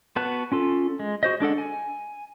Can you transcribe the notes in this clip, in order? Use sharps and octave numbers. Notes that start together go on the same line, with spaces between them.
B3 F#4 B4 A5 F#6
C#4 F4 A4
G#3
F#4 C5 D#5
G#3 D4 A4 F#5
G#5